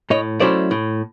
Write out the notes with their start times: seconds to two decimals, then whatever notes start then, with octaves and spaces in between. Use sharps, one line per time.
0.10 A2 C#5 D#5
0.40 F#3 A3 C#4 E4 C5 D5
0.71 A2